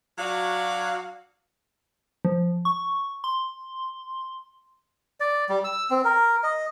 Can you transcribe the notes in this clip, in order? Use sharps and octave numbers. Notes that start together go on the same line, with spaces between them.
F#3 D4 F#4 F5
F3
C#6
C6
D5
G3
E6
C4
A#4
D#5